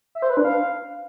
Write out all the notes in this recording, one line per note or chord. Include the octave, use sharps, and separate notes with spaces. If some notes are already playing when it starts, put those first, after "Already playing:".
E5
C5
B4
D4
F5